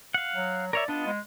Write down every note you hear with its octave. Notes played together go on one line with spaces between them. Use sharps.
F5 F#5
F#3
A#4 C#5 D5 E5
B3 D4 F4 D#5
G#3